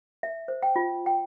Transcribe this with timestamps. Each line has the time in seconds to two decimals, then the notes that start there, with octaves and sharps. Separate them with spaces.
0.23 E5
0.48 C5
0.63 G5
0.76 F4
1.06 G5